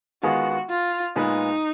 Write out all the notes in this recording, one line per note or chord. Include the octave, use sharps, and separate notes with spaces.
D#3 G#3 B3 F4 F#4 G#4
F4
A#2 G#3 B3 D#4 F4 B4